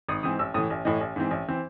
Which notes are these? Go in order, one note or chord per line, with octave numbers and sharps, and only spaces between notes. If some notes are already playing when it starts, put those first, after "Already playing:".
G#1 D#6
G#2 E3 C4 D#6
A1 E6
A2 E3 D#6
A1
A2 E3 D#5
A1
G#2 E3 C4
A1
E3 C4